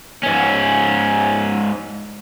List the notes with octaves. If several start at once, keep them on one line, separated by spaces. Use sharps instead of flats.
G#2 C#4